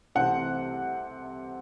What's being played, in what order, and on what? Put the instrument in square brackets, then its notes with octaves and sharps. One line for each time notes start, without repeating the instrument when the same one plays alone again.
[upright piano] C2 C3 E3 A3 C4 F#5